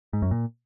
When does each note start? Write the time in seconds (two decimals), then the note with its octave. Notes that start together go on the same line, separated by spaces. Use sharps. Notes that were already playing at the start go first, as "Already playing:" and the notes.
0.13 G#2
0.22 F#2
0.31 A#2